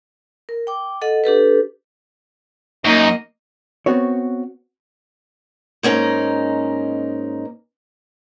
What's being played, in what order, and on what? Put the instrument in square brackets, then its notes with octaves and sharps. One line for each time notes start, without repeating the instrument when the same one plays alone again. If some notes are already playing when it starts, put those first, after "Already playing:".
[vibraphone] A#4
G5 D6
A4 D#5 F#5
D4 G4 A4 B4
[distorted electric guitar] F#2 [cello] A#3 D#5 [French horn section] D#4
[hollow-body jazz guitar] B3 C4 F#4 C#5
[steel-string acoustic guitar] G#2 A#3 C#4 D#4